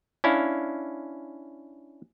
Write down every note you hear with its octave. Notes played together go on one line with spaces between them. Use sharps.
C#4 D4 E4 F5